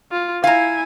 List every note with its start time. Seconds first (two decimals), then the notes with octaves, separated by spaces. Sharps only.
0.11 F4
0.44 E4 F5 G#5 A#5